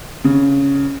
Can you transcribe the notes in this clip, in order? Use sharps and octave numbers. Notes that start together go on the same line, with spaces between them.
C#3